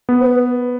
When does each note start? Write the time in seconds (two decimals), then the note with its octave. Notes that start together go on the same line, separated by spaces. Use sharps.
0.09 B3
0.21 C5
0.26 B4